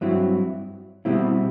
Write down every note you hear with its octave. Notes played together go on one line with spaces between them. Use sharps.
G2 F#3 C4 E4
B2 G3 C4 E4